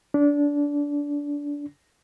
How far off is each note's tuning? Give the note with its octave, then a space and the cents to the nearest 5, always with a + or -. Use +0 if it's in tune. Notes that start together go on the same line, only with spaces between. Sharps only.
D4 -20